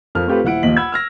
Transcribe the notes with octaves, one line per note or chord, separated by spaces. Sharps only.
F2 F3 A4 A#4 F6
A3 C4 F4 G4 A4 B4
D#1 E4 F#5 D7
A#1 D#2 D#5 B6 F#7
F#5 B5 E6 G#6
E6 F6 A#6